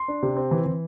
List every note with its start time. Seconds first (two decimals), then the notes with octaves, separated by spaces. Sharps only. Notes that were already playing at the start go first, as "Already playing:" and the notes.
Already playing: C6
0.08 D4
0.23 C3
0.37 C4
0.51 E3
0.66 E3